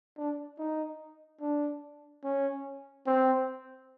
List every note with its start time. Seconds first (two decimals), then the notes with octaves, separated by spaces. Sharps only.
0.18 D4
0.59 D#4
1.41 D4
2.24 C#4
3.07 C4